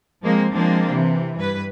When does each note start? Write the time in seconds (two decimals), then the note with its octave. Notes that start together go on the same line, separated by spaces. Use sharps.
0.22 F3 G#3 A#3 C4
0.52 F3 G#3 A#3 C4 D4
0.89 C3 E3
1.38 G2 B4